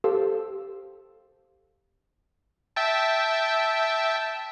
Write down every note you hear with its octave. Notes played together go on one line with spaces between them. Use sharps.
G4 A4 C5 F5 E6
E5 G5 A5